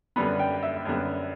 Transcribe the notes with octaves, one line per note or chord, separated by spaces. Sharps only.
F#2 D3 G3 B3 B5
G5
E5
F#2 D3 G3 B3